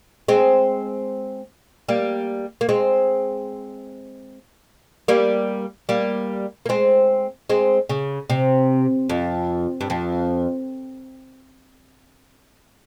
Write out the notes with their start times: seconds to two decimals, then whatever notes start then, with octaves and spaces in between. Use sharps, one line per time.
0.28 G#3 C4
1.88 G3 A#3
2.61 A#3
2.69 G#3 C4
5.08 G3 A#3
5.89 G3 A#3
6.66 A#3
6.69 G#3 C4
7.49 G#3 C4
7.89 C#3
8.30 C3
9.09 F2
9.81 G2
9.90 F2